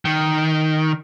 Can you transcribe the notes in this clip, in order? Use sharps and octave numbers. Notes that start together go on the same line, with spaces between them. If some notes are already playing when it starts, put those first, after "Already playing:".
D#3